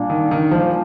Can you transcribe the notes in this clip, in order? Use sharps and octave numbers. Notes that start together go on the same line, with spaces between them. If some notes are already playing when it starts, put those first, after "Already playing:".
Already playing: A#2 G3 A#3 D4
D#3
D#3
A#2 F3 G3 A#3 D4